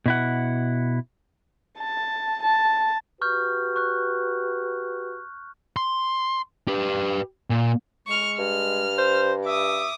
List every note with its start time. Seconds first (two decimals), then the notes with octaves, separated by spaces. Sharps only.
0.06 B2 E4 F#5
1.78 A5
2.43 A5
3.21 F#4 G4 B4 C#6 F6 G6
3.76 C#6 F#6
5.76 C6
6.68 G4 B4
7.50 A#2
8.07 G#3 C#6 F6
8.38 G2 F6
8.98 C5
9.46 E5 D6 D#6